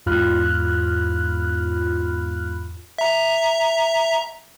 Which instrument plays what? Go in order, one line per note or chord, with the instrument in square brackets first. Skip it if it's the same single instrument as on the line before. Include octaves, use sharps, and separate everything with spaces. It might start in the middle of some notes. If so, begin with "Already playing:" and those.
[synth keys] E2 G#2 F4 B5 F6 F#6
[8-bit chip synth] E5 A#5